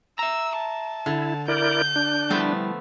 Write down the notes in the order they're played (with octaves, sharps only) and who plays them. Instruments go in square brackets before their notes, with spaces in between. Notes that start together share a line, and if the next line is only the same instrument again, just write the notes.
[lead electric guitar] E5 A#5 [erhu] E6
[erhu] A5
[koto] D3 [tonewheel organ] E4
[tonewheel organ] E4 A#4 D5 [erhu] G6
[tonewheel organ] D4
[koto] F3 A3 B3 [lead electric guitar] G3 E4